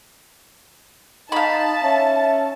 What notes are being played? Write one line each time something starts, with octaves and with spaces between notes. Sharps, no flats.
D#4 F5 A5 B5
C#4 E5